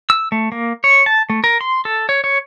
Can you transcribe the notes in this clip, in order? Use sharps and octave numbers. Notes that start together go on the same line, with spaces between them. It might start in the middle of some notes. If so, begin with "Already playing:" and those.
E6
A3
A#3
C#5
A5
A3
A#4
C6
A4
C#5
C#5